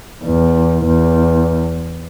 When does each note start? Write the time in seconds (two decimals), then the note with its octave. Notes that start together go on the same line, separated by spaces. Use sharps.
0.25 E2
0.86 E2